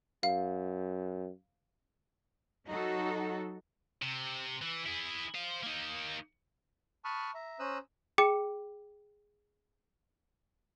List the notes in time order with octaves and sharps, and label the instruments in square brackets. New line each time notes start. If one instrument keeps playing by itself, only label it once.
[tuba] F#2 [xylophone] F5
[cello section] F#3 D#4 F#4 A4
[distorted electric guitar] C3
E3
E4 G#4
C5 F5
A#3 D#4
[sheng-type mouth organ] A5 B5 C#6 D#6 F6 F#6
E5 A#5
C#4 C5 A#5 D#6 E6 F#6
[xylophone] G#4 G5 D6 C#7